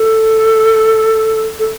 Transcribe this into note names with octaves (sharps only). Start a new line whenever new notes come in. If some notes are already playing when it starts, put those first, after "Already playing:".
Already playing: A4
A4